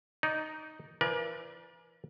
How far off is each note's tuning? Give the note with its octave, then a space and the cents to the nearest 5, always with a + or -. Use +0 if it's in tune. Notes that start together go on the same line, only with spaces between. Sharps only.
D#4 +0 D5 -30
E3 +40 A#4 +40 D5 +0